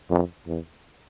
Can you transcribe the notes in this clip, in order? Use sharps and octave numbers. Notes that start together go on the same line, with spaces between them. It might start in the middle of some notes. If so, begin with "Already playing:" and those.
F2
E2